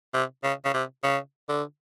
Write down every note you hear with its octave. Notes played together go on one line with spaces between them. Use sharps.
C3
C#3
C#3
C3
C#3
D3